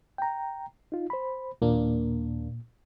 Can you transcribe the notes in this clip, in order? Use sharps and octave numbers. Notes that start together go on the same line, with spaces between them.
G5 A#5
D#4 F4
C5 B5
D#2 A#2 A#3 D4